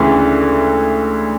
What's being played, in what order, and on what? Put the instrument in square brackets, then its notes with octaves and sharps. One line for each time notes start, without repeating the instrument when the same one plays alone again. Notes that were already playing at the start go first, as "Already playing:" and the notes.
Already playing: [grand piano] D2 C#3 E3